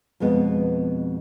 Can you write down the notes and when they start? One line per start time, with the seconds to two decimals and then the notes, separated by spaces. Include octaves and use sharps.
0.20 F2 B2 G#3 B3